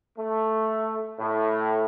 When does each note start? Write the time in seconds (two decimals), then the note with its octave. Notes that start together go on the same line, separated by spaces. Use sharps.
0.18 A3
1.19 A2